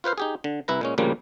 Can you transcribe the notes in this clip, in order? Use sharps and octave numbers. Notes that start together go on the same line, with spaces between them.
F4 B4 C5 F5
D#4 G4 G#4
D3
C2 E4 B4 A#5
A#2 G#3 C#4
D2 A#2 C#3 F3 G3 A#3